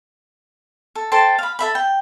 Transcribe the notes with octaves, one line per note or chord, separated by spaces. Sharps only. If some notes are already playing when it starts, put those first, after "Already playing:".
A4
A4 C5 G5 A5
F5 B5
A4 E5 B5
G5